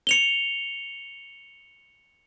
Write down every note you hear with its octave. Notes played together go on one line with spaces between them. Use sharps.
C#7 F7 G7